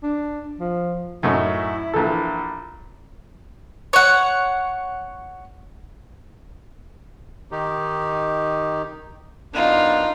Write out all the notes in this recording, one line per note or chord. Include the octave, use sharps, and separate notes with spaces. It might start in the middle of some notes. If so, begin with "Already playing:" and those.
D4
F3
F#2 A2 D#4 E4
A#1 E3 A4
C#5 F#5
D#3 D#4 G4
F#2 B3 D4 D#4 F4